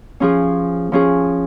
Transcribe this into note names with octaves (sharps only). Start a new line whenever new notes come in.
F3 C#4 F4 G#4
F3 C#4 F4 G#4